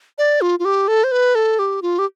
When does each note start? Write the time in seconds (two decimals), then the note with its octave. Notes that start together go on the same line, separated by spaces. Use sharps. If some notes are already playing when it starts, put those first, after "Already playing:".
0.18 D5
0.41 F4
0.59 F4
0.65 G4
0.88 A4
1.04 C5
1.12 B4
1.35 A4
1.59 G4
1.82 F4
1.99 G4